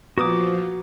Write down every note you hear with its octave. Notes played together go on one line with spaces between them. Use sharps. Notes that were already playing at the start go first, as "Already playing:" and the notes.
A#2 F3 B3 F#4 D6 D#6